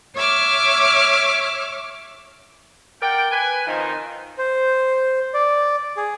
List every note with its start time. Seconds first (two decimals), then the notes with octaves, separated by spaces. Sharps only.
0.16 C#5 E5 D6 F6
3.01 A#4 D5 F#5 G5
3.31 B4 G#5
3.67 D#3 F3 C4 D#4
4.38 C5
5.34 D5
5.97 G#4